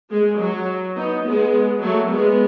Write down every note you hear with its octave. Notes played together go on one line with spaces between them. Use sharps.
G#3
F#3
B3 D#4
G#3 B3
F#3 A3
G#3 B3